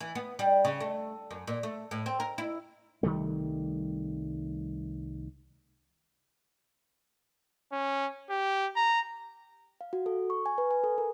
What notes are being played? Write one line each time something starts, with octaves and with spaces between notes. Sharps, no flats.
E3
B3
G3
C#3
A3
F#2
A#2
A3
A2
C4
A#4
E4
C2 D#3 G3 A3
C#4
G4
A#5
F5
F#4
A4
C#6
G#5
B4
G#5
A4
A#4